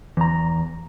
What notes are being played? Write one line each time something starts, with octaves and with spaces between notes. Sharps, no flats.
E2 A#5